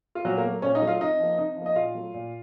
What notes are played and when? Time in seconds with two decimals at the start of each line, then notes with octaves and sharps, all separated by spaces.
0.15 F4
0.25 A#2 F#3 F#4
0.37 A#3 A#4
0.43 F#3 A3
0.62 A#2 C#4 C#5
0.75 D#4 D#5
0.82 F#3 A3
0.87 F4 F5
1.01 C3 D#4 D#5
1.20 F3 A#3
1.38 C3 D#4 D#5
1.56 F3
1.62 A#3 D#5
1.75 A#2 F4 F5
1.95 F#3 A3
2.14 A#2